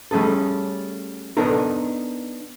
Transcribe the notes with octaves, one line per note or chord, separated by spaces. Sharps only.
G3 A3 C#4 G#4 A4
B3 D4 D#4 A4 A#4